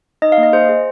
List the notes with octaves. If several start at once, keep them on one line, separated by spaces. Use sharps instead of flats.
D#4 D#5
F5
A#3
D#5
G#4 C5
G#4